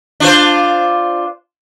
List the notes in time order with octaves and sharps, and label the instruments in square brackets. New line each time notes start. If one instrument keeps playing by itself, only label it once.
[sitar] D4 F4 C5